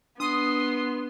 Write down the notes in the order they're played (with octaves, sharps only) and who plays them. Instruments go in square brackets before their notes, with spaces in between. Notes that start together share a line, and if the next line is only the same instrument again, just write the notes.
[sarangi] B3 [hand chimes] D4 [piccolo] C6 [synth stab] D#6